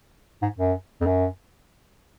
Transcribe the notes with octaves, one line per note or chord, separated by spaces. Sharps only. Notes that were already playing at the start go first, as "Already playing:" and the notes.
G#2
F#2
F2
F#2